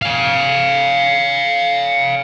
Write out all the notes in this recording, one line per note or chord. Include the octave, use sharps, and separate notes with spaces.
F5 G#5